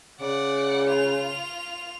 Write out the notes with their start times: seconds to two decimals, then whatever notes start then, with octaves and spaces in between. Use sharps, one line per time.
0.20 C#3 D5 F#5
0.88 F4 F7